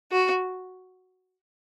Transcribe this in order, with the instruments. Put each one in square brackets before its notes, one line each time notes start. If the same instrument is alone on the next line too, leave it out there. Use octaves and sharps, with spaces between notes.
[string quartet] F#4